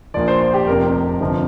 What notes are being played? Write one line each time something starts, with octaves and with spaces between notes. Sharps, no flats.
A#1 A#2 F3 D5
C5
C5
G4
F1 F2 C3 F3 A#4
G1 F2 C3 F3